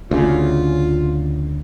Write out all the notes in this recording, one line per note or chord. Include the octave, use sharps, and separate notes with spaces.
D2 C#3 F4